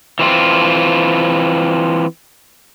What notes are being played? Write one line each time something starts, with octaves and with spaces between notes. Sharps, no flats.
E3 C4 F4